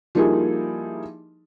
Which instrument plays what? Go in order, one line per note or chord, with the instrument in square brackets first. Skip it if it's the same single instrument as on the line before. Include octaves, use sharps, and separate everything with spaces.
[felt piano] F3 G3 A#3 D#4 E4 G#4